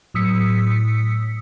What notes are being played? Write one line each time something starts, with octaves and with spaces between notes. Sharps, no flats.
A2 F#3 D#6 E6 B6 C#7